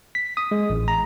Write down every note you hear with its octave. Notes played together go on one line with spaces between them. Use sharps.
B6
D#6
G#3
A1
A#5